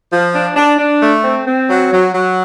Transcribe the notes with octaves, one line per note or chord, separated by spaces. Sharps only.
F3
D4
D4
D4
A3
C4
C4
F#3
F#3
F#3